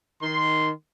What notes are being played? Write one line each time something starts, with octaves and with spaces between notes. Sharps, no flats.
D#3 C6